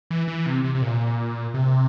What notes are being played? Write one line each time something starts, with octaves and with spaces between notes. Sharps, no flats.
E3
E3
C3
C3
C3
A#2
C3